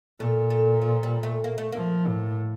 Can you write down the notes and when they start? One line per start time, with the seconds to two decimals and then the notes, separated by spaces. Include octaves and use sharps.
0.20 A#2 A3
0.50 A3
0.82 F3
1.03 G3
1.23 A3
1.44 A#3
1.58 A3
1.72 F3 A#3
2.07 A2